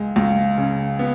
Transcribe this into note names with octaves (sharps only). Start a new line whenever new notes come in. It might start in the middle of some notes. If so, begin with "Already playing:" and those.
Already playing: C#2 G#3
C#2
C#3
B3